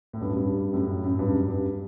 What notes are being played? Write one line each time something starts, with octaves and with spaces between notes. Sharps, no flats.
A2
G2
F#2
G2
F#2 A2
F#2
G2
F#2
G2